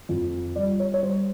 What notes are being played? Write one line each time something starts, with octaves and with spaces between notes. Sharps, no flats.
F2
G3 D5
C#5
C#5
G3 C5